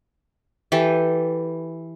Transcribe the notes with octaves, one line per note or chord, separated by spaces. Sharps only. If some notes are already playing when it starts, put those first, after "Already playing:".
E3 G4 A4